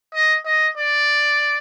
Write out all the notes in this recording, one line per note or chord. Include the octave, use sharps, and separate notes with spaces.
D#5
D#5
D5